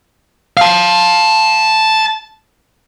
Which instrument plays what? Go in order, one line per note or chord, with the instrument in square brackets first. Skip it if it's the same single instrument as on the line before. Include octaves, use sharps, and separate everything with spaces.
[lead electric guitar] F5 A5